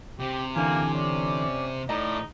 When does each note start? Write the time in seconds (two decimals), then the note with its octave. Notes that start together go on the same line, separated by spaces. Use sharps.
0.20 C3 G4
0.56 D3 E3 A#3 G#5
0.95 C#4 D5
1.89 A2 D#4 D5 D#5 A5 A#5